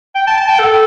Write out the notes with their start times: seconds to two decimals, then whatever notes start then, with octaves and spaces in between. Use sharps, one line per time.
0.15 G5
0.27 A5
0.37 A5
0.48 G5
0.59 A4